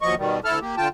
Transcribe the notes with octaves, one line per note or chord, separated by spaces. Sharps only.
D#2 F3 F#3 D#5 C#6
B2 D#3 G3
D2 E4 A4 A5 F6
A#3 G4
D3 F4 G5 A5